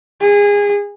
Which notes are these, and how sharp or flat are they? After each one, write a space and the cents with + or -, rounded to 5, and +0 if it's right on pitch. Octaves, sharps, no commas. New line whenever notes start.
G#4 -25